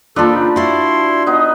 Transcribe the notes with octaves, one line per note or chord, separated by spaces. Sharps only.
F3 A#3 D4 F4 A4 B5
C#3 D#4
E4 F#4 D5 F5 C6
B3 D#4